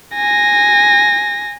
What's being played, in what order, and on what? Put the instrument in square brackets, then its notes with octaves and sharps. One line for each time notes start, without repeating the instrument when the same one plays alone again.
[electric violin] G#5 A#6